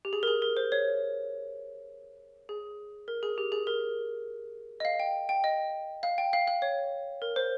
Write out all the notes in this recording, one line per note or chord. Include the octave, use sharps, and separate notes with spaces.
G4
G#4
A#4
G#4
A#4
C5
C#5
G#4
A#4
G#4
G4
G#4
A#4
D#5
F5
G5
G5
D#5
F5
G5
F5
F5
C#5
A#4
C5